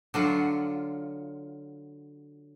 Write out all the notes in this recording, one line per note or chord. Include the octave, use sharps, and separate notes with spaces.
D3 F#3 F4